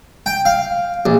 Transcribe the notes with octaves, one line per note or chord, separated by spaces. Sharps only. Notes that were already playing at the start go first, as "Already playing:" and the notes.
G5
F5
A#1